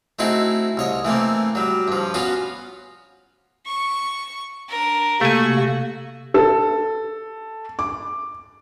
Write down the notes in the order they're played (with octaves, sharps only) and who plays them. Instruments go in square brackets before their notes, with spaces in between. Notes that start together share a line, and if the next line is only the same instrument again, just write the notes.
[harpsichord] A3 C4 D#4 E4 F#4 G#4
C2 C#5 D#5
E3 A3 A#3 C4
F#3 G3
G2 F3
B3 C#4 F4 F#4
[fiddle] C#6
D4 A#4
[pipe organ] C3 A#3 [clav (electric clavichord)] A3 G#5 [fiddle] F#4 C#6
[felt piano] A4
D6